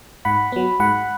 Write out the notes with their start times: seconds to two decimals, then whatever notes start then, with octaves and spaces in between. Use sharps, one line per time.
0.25 G#2 F#5 B5
0.52 F#3 B3
0.80 G#2 F#5 B5